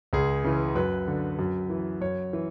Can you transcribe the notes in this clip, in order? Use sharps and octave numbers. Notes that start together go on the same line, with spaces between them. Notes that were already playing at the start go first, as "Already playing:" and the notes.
C#2 G#4
C#3 E3
F#2 B4
D3
F#2
E3
F#2 C#5
E3